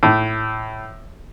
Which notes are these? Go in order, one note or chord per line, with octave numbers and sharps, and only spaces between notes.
A2